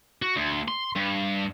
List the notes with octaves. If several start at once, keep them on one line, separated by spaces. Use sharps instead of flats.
F#4
D2
C6
G2